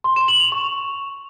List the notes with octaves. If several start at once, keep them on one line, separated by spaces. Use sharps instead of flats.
C6
E7
F#7
F7
C#6